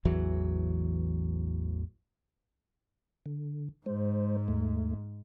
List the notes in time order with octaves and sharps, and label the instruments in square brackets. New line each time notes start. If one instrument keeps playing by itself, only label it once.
[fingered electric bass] A1 E2 E3 F#3
[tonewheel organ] D3
[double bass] G#2 [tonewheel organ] G#3 C5
[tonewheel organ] D#2 A3